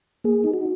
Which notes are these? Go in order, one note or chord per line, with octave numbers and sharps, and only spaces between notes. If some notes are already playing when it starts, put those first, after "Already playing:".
A#3 G#4
D#4
F#4